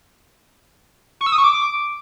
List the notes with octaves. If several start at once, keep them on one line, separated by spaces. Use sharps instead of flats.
C#6
E6
D#6
C#6
D6